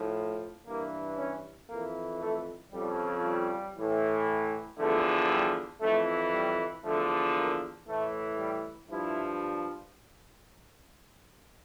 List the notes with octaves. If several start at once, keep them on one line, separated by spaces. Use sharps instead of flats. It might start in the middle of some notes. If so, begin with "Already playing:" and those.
Already playing: A2 F3
G2 E3 A#3
C#4
F2 E3 A#3
A3
F2 C#3 F3 G3
G3
A2 E3
E2 D3 F3 A3
G3
F2 E3 A3
G3
E2 D3 F3 A3
A#3
A2 E3 A3
G3
G2 F3 E4